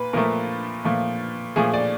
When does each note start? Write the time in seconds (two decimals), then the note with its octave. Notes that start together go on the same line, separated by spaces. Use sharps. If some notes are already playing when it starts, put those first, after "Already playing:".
Already playing: A#2 B4
0.13 A#2 F3 A3 A#4
0.84 A#2 F3 A3
1.56 A#2 F3 A3 G#4
1.74 D5